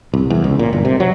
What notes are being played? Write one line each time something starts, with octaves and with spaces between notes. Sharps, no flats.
C2
E2
C#2
A#2
G1
C3
F#3